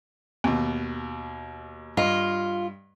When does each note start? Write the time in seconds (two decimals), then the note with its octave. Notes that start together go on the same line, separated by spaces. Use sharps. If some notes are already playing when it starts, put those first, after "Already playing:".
0.44 D#2 B2
1.97 G2 F4 D#5